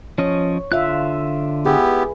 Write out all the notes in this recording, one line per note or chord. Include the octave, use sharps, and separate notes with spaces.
F3 C#4 C#5 D#5
D3 F4 E5 F5 F#6
B3 E4 G4 G#4 B4